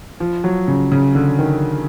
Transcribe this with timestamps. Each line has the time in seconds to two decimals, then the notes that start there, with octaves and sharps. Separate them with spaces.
0.20 F3
0.44 F#3
0.68 C#3
0.92 C#3
1.15 D3
1.39 D#3